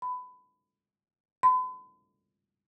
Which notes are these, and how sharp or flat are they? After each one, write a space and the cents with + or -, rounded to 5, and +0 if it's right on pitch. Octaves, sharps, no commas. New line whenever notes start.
B5 +25
B5 +40